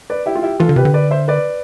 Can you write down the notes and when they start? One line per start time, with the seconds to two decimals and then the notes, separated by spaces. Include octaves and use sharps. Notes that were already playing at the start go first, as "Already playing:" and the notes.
0.10 B4 D5
0.26 E4 G4
0.35 F4
0.43 E4 G4
0.60 E3 F4 A4
0.69 D3
0.76 C3 G4 B4
0.85 D3
0.94 B4 D5
1.10 C5 E5
1.28 B4 D5